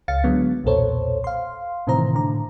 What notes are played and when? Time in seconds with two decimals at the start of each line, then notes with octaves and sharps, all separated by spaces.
0.08 C#2 F5 A6 C#7
0.24 D3 F#3 G#3 B3
0.64 B1 E2 A#2 A4 C5 C#5
1.24 F5 C6
1.87 A2 C3 D#3 E3 C5 A#5
2.15 A2 D3 A#5